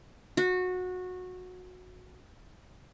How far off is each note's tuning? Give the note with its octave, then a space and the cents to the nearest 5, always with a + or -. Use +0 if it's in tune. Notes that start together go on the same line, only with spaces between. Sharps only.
F#4 -20